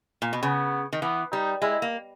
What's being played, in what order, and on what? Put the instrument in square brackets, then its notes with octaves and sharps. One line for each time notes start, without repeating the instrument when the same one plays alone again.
[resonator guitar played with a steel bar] A#2
B2
[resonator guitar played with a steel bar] C#3 [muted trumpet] B3
[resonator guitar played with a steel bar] D#3
[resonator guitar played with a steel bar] E3 [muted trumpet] B3
[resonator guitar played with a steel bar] G3 [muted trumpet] D#4
[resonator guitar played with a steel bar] G#3 [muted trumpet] E4
[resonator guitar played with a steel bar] A#3